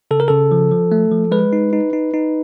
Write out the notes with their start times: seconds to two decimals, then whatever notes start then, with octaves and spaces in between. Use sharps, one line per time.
0.11 C#3 A4
0.20 A#4
0.28 C#3 A4
0.51 F3
0.72 F3
0.92 A3
1.11 F3
1.32 G#3 B4
1.53 D#4
1.73 D#4
1.93 D#4
2.14 D#4